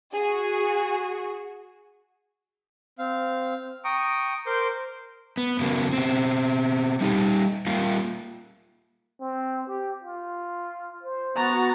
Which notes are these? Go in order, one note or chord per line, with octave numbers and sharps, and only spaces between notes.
F#4 G#4
C4 F5
G5 A#5 C#6 D#6
A#4 C5 C6 D6 G6
B3
C#3 F#3 A#3 B3
B2 C4
G3 D#4 F#4 G4
G3 A#3 F4
C4
G4
F4
C5
B3 F#4 A#5 A6